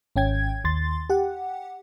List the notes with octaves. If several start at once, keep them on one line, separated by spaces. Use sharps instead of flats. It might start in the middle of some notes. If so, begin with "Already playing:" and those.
G#1 C#4 G5 G#6
D#2 C6 A6
G4 F#5